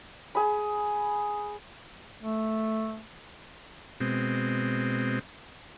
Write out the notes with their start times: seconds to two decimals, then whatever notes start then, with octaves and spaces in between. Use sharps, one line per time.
0.35 G#4 B5
2.23 A3
4.00 B2 G#3 C4